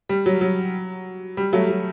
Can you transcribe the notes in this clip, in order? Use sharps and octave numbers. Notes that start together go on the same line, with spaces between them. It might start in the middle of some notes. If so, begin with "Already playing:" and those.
G3
F#3
F#3
G3
F#3 A3
F#3